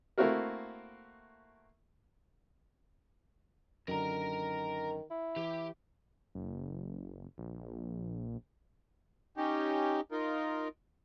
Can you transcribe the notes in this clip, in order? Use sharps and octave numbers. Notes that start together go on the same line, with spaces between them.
A3 A#3 C4 E4 F#4 A#4
F#2 D3 D#3 A#4 A#5
E4
E3 G4
F#1
A#1
C#4 D#4 G4
D#4 F4 A#4